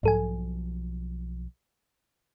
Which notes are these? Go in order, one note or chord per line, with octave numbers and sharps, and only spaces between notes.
B1 G#2 F3 A4 G#5